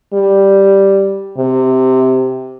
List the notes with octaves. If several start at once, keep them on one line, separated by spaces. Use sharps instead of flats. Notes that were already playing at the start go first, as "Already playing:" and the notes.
G3
C3